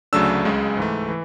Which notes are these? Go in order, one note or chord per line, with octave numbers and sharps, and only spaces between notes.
D2 C#3 F#3 A3 D4 E6
C#2 C#3 G#3
G#2 E3 A3
E3